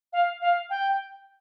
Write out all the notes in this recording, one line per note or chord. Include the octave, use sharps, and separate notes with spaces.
F5
F5
G5